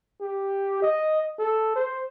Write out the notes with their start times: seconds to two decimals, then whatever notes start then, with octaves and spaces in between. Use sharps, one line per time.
0.21 G4
0.82 D#5
1.39 A4
1.76 C5